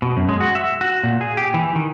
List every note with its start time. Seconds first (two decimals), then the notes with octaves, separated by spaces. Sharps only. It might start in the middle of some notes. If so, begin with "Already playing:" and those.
0.02 B2
0.17 F#2
0.29 G#3
0.40 F#4
0.55 E5
0.81 F#4
1.04 A#2
1.21 G#4
1.37 G4
1.54 E3
1.75 D#3